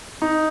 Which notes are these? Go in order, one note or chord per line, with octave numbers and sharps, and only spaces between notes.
D#4